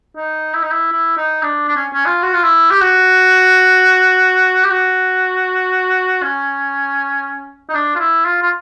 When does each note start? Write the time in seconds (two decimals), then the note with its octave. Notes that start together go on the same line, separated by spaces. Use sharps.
0.16 D#4
0.54 E4
0.63 D#4
0.71 E4
0.92 E4
1.17 D#4
1.43 D4
1.68 D4
1.76 C#4
1.94 C#4
2.06 F4
2.22 F#4
2.33 F4
2.43 E4
2.71 G4
2.81 F#4
4.64 G4
4.71 F#4
6.22 C#4
7.69 D#4
7.74 D4
7.95 F4
7.99 E4
8.25 F4
8.42 F4